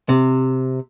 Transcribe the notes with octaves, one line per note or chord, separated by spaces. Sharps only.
C3